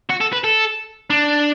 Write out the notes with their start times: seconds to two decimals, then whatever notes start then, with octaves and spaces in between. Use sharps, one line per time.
0.10 F#4
0.21 A4
0.33 B4
0.44 A4
1.10 D4